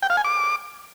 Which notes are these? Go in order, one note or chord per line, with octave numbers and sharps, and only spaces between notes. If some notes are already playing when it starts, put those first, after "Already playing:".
G5
F5
G#5
D6